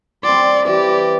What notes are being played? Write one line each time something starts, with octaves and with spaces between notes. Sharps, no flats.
G3 C4 D5 C6
E3 G4 D5